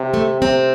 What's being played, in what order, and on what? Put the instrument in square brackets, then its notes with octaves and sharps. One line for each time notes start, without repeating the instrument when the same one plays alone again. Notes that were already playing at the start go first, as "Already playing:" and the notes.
Already playing: [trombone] C3
[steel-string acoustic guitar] A3
[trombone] C3 [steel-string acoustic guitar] C4